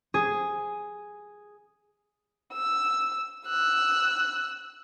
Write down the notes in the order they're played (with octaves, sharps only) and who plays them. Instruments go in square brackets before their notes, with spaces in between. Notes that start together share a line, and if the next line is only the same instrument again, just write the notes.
[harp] G#4
[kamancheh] E6
E6 F#6